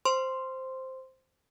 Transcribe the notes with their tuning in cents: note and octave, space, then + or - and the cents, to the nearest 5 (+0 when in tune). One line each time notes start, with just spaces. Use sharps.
C5 +0 C6 +0